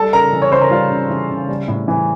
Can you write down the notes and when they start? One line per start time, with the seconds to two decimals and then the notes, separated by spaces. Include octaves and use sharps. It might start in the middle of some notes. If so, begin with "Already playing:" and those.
Already playing: G3 A4 A5
0.13 C#3 A#4 A#5
0.33 E3
0.42 C#5 C#6
0.51 C#3 C5 C6
0.61 A#4 A#5
0.71 G3 F4 F5
0.91 C#3
1.10 E3
1.30 C#3
1.48 G3
1.68 A2
1.88 E3